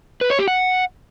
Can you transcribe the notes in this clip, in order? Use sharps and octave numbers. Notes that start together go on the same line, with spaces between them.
B4
C#5
G4
F#5